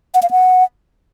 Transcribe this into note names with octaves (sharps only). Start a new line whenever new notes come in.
F#5
F5
F#5